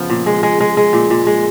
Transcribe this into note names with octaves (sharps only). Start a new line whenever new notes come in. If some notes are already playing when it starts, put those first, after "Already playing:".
Already playing: C#3 F3 B3
A#2
G#3
G#3
G#3
G#3
A#2
A#2
G#3